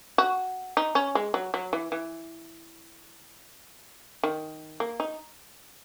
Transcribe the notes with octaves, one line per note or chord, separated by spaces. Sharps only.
F#4
D#4
C#4
G#3
F#3
F#3
E3
E3
D#3
A#3
D#4